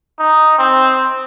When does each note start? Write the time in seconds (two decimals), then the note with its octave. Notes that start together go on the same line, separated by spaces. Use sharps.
0.19 D#4
0.58 C4